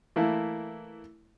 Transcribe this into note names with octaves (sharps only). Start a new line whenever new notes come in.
E3 A3 A#3 E4